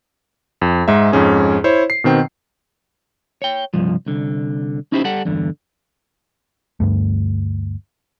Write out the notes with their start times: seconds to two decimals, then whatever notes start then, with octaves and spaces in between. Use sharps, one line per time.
0.62 F2
0.88 G#2 G#3 D#4 E5
1.12 F2 G#2 C#4 G#4
1.64 E4 C5 C#5
1.90 C7
2.04 B2 D#3 C4 G5
3.42 C#5 G5
3.74 C2 G2 F3
4.06 C2 D3
4.92 C#4 D#4 E4 G4 C5
5.04 G3 A4 F#5
5.25 E2 G2 D3
6.80 D2 G2 A3